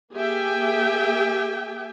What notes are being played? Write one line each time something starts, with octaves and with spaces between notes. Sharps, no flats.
A#3 G4 G#4 E5 G5 G#5